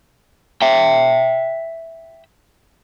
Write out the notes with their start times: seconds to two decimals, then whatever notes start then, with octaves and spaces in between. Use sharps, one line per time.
0.62 E5 G5